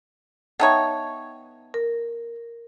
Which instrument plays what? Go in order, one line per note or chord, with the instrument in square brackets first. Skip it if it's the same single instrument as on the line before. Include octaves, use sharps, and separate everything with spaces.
[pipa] B3 D#4 C#5 [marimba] E5 G5 A5
[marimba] A#4